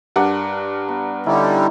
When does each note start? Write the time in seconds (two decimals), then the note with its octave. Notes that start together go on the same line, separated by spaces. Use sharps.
0.16 G2 D4 A#4 F#5
0.88 B3
1.26 D3 G3 C#4 D#4 E4